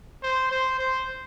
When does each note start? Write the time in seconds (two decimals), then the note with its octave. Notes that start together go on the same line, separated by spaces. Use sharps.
0.23 C5
0.51 C5
0.79 C5